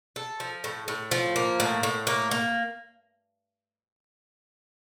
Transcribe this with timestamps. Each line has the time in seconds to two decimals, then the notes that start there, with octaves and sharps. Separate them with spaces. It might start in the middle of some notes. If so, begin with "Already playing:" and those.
0.16 A4
0.40 F3
0.64 A2
0.88 A2
1.11 F3
1.36 A#3
1.60 A2
1.83 A2
2.07 A#3
2.31 A#3